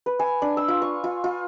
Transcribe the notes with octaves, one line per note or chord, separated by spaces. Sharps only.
B4
G#5
D4
E6
F4
C#6
F4
F4